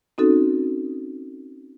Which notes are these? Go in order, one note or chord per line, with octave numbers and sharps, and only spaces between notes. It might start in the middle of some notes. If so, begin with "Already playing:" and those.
C4 C#4 D#4 F#4 A4